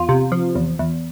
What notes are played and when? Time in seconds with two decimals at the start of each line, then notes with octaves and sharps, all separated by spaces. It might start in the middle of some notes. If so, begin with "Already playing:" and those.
Already playing: E2 F4
0.09 C3
0.32 F3
0.55 E2
0.79 E2